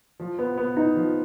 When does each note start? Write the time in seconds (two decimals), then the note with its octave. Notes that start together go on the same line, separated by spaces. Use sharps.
0.20 F3
0.39 B3
0.57 B3
0.77 D#4
0.96 F3